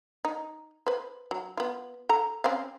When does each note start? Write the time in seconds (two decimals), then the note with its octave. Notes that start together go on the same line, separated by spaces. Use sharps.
0.25 D#4
0.87 B4 C5
1.31 F#3
1.57 B3 F4
2.09 A4 A#5
2.44 C4 C#4 F5